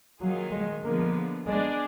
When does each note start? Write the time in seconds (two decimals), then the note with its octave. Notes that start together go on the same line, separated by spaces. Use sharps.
0.20 D#3 F#3 A#3 F4 G#4
0.51 G#3
0.83 D3 F3 G#3 A#3 B3
1.47 G#3 B3 D4 G#4 D5